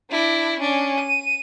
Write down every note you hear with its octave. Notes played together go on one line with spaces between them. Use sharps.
D4 E4
C#4 D4
D#7